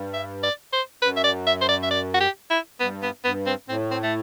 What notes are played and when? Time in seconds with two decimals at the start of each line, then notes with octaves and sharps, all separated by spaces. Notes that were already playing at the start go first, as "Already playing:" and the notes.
Already playing: G2
0.14 E5
0.43 D5
0.73 C5
1.02 F#2 B4
1.17 E5
1.24 D5
1.47 E5
1.61 C5
1.69 D5
1.83 E5
1.91 D5
2.14 F#4
2.20 G4
2.50 E4
2.80 G2 B3
3.02 B3
3.24 G2 B3
3.46 C4
3.68 A2 C4
3.91 C4
4.03 A3